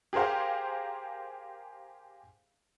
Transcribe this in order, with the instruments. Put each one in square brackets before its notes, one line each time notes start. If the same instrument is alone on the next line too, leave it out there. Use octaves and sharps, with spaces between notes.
[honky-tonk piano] G4 G#4 A#4 C5 F5